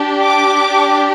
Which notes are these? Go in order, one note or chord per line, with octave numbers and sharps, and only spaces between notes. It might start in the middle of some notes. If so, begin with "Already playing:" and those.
Already playing: D4 G4
D6